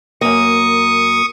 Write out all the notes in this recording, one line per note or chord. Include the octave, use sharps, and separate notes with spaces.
F#2 A#3 C#6 D#6